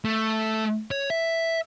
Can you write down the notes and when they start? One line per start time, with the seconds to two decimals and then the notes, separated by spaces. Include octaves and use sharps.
0.05 A3
0.91 C#5
1.10 E5